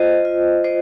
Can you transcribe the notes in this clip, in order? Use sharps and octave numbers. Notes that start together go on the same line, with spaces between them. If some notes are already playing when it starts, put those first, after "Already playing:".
Already playing: F4 C5 D#5
F4
C5 D#5